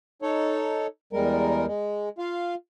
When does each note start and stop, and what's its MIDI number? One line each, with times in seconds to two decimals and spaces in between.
0.22 0.87 63
0.22 0.87 69
0.22 0.87 73
1.13 1.66 40
1.13 1.66 55
1.13 1.66 56
1.13 1.66 70
1.66 2.09 56
2.19 2.55 65
2.19 2.55 77